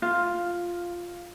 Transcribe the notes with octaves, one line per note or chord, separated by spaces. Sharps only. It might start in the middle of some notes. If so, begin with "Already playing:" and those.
F4